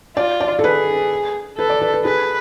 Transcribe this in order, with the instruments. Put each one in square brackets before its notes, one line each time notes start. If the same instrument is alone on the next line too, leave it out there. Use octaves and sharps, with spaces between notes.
[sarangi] F4 [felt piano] D5
[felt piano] D5
A4
[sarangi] G#4 [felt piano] B4
[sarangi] A4 [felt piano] B4
[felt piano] D5
B4
B4
[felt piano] G#4 [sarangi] B4